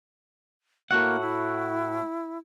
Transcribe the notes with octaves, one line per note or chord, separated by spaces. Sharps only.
A2 A#3 F#4 F#5
E4